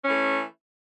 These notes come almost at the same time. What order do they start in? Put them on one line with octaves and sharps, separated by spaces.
C#4 E3 A3